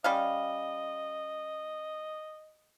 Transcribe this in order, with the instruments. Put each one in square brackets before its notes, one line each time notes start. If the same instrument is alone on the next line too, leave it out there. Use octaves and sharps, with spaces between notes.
[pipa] G3 C#4 F5 [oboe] D#5